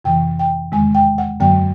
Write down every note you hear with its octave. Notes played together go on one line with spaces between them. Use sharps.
F2 C3 E3 G5
G5
E2 C3 D#3 G#3 G#5
G5
F#5
F#2 D3 F#3 A#3 G5